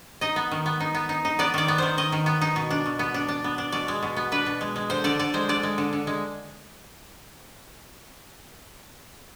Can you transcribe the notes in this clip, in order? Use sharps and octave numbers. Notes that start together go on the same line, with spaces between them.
D#4 D#5
B3
D#3
B3
D#4
B3
D#4
D#4
B3 D5
D#3 D5
B3
D#3 C5
D#3 D#5
D#3
B3
D#4
B2
D4
B2
B3
D4
D4
B3
D4
B2 D5
G#3
B2
B3
D4 B4
B2
G#3
G#3
D3 C5
D3 D5
D3 D5
G#3 C5
D3 D5
G#3
D3
D3
G#3